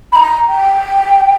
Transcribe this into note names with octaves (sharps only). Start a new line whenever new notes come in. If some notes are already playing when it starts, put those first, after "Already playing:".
B5
A#5
G5